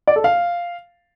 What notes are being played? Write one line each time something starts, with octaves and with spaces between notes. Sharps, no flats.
D5
A4
F5